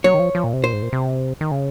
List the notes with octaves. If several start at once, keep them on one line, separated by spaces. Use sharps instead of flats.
F#3 C#5
D#3
F3
F3
A#2
C3
A#2 C5
G#2
A#2
C3
D#3
C#3